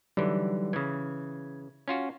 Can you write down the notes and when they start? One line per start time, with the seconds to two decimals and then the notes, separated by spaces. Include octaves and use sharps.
0.17 D3 E3 F#3 G3 D#4
0.73 C#3 E3 G#6
1.88 C#4 F4 F#4